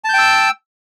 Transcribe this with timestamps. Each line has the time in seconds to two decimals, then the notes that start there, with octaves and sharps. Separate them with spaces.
0.04 A5
0.09 G6
0.14 G5
0.18 E6